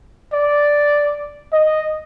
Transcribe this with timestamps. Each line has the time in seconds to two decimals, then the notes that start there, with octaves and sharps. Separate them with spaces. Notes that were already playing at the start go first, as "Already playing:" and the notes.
0.33 D5
1.53 D#5